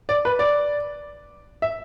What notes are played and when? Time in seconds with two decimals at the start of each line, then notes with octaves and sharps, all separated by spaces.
0.09 D5
0.25 B4
0.39 D5
1.62 E5